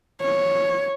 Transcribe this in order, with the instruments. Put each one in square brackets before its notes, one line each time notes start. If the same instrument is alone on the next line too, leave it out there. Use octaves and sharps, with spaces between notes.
[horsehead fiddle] C#5